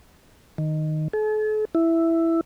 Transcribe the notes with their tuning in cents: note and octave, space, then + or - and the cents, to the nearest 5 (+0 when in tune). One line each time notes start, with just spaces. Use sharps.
D#3 -5
A4 -45
E4 +5